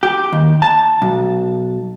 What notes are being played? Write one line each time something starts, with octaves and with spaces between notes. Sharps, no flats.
G4
D#2
A5
B1